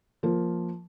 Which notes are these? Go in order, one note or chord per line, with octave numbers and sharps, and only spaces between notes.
F3 A#3